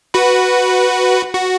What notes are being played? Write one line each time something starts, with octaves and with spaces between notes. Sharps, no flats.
F#4 B4
F#4